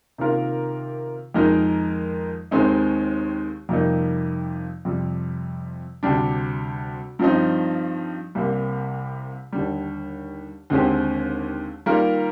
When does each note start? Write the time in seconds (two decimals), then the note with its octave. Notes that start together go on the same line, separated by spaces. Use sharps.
0.18 C3 D#3 A#3 F4 A#4
1.34 F2 D#3 G#3 D#4 A#4
2.51 D#2 D#3 G#3 C4 D#4
3.69 F2 C3 G3 A#3 D#4
4.85 F2 C3 G3
6.03 D2 C3 G3 D4
7.19 G2 F3 C4 D#4
8.35 C2 C3 G3 A#3
9.53 D#2 D3 G3
10.70 D#2 D3 G#3 C4 G4
11.86 D#3 G3 A#3 F4 A#4